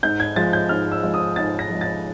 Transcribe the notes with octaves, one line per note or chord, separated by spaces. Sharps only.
G#2 G6
G#6
F3 G#3 A6
G6
G#2 F6
E6
F3 G#3
D#6
G#2 A6
A#6
F3 G#3
A6